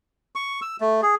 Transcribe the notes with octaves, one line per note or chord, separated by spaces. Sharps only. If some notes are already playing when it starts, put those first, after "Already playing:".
C#6
E6
A3
G#4